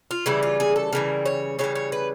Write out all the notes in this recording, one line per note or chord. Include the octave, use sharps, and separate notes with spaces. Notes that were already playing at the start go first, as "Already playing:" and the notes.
F4
C#3 E3 G3 E4
F4
G#4
A4
C#3 E3 G3 A#4
C#5
C#3 E3 G3 C#5
C#5
B4